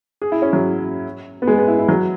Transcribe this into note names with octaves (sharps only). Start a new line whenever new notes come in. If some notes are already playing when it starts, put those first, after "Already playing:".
G#4
E4
C#4
F#3
B3
G#3
B3
E4
E4
F#3